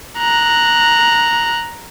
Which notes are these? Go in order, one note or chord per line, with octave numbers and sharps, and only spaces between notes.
A#5 F#6